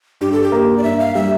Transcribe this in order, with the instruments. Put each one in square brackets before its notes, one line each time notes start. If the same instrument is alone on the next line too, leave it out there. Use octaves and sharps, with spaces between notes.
[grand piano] G2 [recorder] G4
[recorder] A4
G4
[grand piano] A#3
[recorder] D5
[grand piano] G2 [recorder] E5
[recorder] F5
[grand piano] G3 [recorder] E5